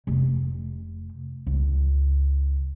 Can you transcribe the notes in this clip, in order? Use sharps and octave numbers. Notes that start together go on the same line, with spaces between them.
F1
C#2